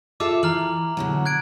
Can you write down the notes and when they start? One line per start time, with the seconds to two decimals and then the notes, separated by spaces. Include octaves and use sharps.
0.20 F4 A4 E5 D6
0.43 E3 A#5 F6 F#7
0.97 B2 D3 F#3
1.26 F#6 G#6 D7